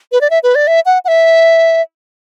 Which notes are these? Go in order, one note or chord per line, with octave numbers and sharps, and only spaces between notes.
B4
D5
E5
B4
D5
E5
F#5
F#5
E5